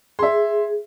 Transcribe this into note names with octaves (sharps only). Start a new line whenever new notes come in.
G#4 E5 C6